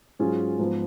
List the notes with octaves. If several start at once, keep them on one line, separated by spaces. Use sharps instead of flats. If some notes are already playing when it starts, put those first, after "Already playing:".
G#2 F#3 C#4 F4 G#4
G#2 F3 B3